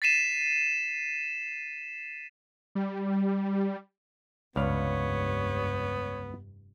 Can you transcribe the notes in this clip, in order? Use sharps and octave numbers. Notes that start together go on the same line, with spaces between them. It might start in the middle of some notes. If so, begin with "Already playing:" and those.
A6 B6 C7 D#7 E7
G3
F1 C#2 G2 B3 C#5 D5 F5